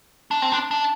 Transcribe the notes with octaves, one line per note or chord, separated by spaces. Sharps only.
D4
C4
D4
D4